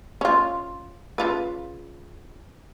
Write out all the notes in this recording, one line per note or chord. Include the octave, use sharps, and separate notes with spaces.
C#4 F4
C#3 F4 B4